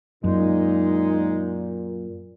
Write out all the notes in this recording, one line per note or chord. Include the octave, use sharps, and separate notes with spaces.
F#2 A#2 G#3 D#4